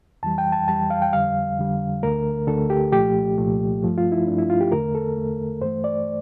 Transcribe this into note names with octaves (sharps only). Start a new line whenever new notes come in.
F2 E3 G3 A5
G5
A5
F2 E3 G3 A5
F5
G5
F2 D3 G3 F5
F2 D3 G3
D2 D3 A3 A#4
D2 D3 A3 A4
G4
C2 A#2 F3 A3 G4
C2 A#2 F3 A3
G2 F3 A3
F4
E4
G2 F3 A3 D4
E4
F4
G4
E2 D3 A3 A#4
A4
E2 D3 A3
G2 E3 A3 C5
D5